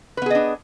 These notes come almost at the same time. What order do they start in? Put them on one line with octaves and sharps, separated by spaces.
B4 B3 G#4 D#5 D4